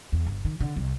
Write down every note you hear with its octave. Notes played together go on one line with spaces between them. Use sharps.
E2
G1
D#3
D3
C2